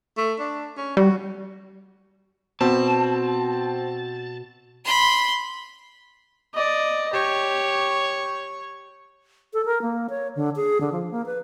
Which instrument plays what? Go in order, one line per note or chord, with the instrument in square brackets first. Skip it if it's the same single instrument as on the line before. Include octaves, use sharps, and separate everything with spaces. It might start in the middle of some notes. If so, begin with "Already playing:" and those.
[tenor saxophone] A3
D4
C#4
[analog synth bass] G3 [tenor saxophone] F#4
[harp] B2 [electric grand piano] C4 [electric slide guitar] A5
[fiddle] B5 C6
[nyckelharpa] D5 D#5
[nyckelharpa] G4 [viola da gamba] C#5
[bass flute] A4
A#4
A#3
C#5
D3
G#4
D3
F3
A#3
B4